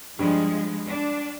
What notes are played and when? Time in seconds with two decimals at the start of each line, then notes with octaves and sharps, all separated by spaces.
0.19 G2 F3 G#3
0.86 D4